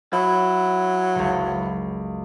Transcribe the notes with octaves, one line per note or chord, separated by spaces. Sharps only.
F#3 E4
F#1 C#2